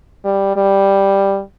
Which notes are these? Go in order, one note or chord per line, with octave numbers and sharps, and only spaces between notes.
G3
G3